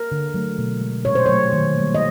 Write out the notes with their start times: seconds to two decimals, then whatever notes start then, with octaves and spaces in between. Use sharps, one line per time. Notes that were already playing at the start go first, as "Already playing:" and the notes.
Already playing: A#4
0.12 D3
0.34 F#3 A3
0.58 B2
0.81 G#3
1.05 A#2 C#5
1.15 C5
1.26 F#3 A3 C#5
1.52 D#3
1.77 G3 A#3
1.95 D#5